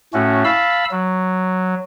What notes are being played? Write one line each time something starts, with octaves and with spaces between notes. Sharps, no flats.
A2 A3 C#4 F#4
F5 A5 B5 E6
F#3